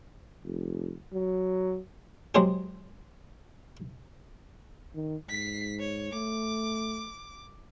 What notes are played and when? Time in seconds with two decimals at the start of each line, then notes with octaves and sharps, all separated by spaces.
0.43 F1
1.13 F#3
2.35 F#3 G#3 C4 G4 G#4
4.95 D#3
5.29 G#2 B6 C7
5.79 C#5
6.12 A3 D6